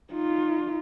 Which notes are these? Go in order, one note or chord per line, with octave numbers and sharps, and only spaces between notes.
D#4 F4